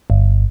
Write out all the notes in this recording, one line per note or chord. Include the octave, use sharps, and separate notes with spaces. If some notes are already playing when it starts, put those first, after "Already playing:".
G1